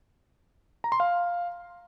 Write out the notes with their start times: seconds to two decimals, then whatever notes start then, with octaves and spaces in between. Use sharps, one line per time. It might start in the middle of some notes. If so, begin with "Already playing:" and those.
0.84 A#5
0.92 C6
1.00 F5